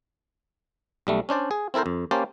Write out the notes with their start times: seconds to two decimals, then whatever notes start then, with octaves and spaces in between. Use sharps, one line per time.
1.07 B1 G3 A3
1.29 C#4 D4 C5 D5
1.51 G#4
1.74 C4 E4 A4 A#4 C5
1.86 F2
2.11 A#3 C#4 G4 C5 A5